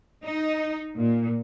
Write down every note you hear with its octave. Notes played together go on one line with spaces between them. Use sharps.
D#4
A#2